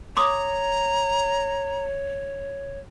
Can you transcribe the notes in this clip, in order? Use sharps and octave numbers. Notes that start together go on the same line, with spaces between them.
C#5 A#5 C6 D6 D#6